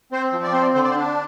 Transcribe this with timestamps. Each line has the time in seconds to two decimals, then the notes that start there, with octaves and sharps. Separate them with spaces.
0.12 C4 C5
0.33 F3
0.43 D5
0.53 C4 C5
0.62 D5
0.74 D3 C5
0.84 D5
0.91 C5
0.95 D4